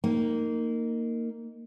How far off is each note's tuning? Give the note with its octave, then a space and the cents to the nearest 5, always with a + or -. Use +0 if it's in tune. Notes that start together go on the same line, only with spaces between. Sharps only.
A#3 -15 D#4 +0